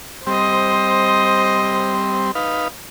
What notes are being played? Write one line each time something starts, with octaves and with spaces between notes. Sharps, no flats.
G3 C4 C5 D#5
D#4 B4 F5